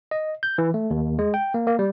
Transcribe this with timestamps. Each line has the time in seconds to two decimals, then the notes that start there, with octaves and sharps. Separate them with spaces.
0.11 D#5
0.43 G6
0.58 E3
0.74 A3
0.90 D#2
1.19 G#3
1.34 G5
1.54 A#3
1.67 A#3
1.79 G3